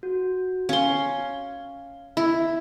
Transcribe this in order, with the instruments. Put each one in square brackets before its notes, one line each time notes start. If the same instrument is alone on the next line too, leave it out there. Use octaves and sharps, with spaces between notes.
[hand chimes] F#4
[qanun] C#4 C6 [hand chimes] F5
[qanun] E4